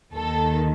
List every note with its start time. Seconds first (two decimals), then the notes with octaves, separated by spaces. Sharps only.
0.12 D#2 D#3 A4